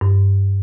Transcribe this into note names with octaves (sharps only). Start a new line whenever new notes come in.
G2